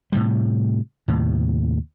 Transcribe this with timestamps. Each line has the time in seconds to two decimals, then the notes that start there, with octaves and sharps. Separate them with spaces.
0.12 A2 C3 G3
1.08 D#2 A2 C3